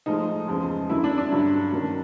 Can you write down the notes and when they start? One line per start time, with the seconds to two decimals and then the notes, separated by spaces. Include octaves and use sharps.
0.06 A2 F3 G#3 D#4
0.47 E2 C#3 F3 G#3
0.89 F#2 D3 F#3 E4
1.04 D4
1.18 D4
1.31 G2 D3 F#3
1.72 F#2 D#3 F#3